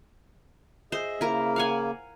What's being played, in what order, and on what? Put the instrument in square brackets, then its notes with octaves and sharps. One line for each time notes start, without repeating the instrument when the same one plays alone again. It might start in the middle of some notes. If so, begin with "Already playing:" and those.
[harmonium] G#4 D#5 E5 [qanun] C5
[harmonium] C#3 A#3 [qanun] E4 A#4
[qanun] F5 F#5 G#5